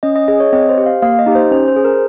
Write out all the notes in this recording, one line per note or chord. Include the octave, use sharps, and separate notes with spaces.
C#4 D#5
D#5
G#4 D#5
C#5
C4 D#5
C5
G4
F5
A#3 F5
D#5
D#4 G4
C5
C#4 C5
C5
G#4
A#4